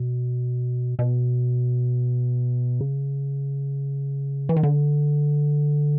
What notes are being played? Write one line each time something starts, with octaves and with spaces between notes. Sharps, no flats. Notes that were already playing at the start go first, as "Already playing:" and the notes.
Already playing: B2
B2
C#3
E3
D#3
D3